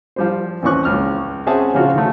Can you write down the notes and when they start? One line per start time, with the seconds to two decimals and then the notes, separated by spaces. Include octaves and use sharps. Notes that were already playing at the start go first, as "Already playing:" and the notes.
0.16 F3 G3 C5
0.62 D#2 E3 C4 C#4 C#6 F#6
0.85 C#2 F6
1.47 C4 C#4 G#4 E5 F#5 A5
1.74 A#2 C#3 F3 F4 F#4
1.95 D#3 A3